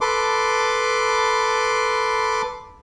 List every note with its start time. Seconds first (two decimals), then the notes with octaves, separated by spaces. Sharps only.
0.01 A4 B4 C6 D6